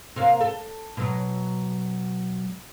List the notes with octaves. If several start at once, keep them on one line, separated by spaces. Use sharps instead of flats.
C3 A#3 F5
A4
B2 F#3